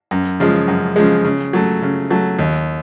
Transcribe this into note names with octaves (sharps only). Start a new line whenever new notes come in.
F#2
C#3 F3 G#3
F#2
C#3 F3 G#3
C#3
F#3 A3
C#3
F#3 A3
D#2